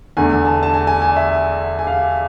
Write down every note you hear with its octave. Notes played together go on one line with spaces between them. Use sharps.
E2 D3 A3 G#5
A5
A5
G#5
G#5
G#5
D5
E5
G#5
F5